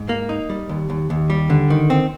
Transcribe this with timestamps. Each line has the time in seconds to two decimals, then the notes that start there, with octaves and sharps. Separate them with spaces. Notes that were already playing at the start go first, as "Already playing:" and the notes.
Already playing: G#2
0.09 A#3
0.29 D#4
0.50 G3
0.69 D#2
0.90 D#2
1.10 D#2
1.30 G3
1.50 D3
1.70 D#3
1.90 C4